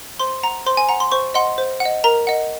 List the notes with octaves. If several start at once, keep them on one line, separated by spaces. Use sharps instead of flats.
C5 C6
F#5 A#5
C5 C6
G#5
F#5 A#5
C6
C5 C#6
D#5 F#5 C6
C5
F#5
D#5
A#4 A#5
D#5 F#5